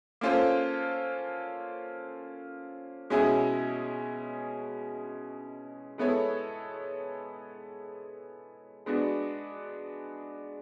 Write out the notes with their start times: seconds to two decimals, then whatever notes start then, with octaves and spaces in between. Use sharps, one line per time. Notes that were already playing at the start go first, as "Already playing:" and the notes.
0.21 A#3 C#4 F4 A4 C5
3.10 B2 G#3 C#4 E4 G#4
5.98 G#3 B3 E4 A4 C#5
8.86 G#3 B3 D4 F#4